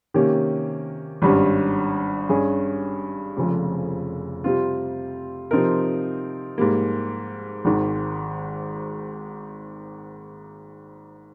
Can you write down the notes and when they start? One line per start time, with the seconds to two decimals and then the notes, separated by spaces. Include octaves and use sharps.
0.14 C3 D#3 A#3 C#4 G4
1.22 G#1 G2 G3 C#4
2.29 G2 G3 C#4 G#4
3.37 F1 F2 C#3 F3 G#3
4.44 C3 G3 C4 F4
5.51 C3 F3 C4 D#4 A#4
6.58 G#2 G3 A#3
7.65 G#1 G#2 D#3